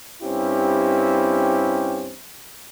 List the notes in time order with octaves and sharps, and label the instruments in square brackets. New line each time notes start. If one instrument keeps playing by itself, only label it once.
[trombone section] G2 C4 C#4 E4 G4